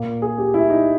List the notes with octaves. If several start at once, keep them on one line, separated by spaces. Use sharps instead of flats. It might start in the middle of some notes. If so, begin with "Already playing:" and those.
Already playing: A#2 A#3
G#4
G4
E4
D#4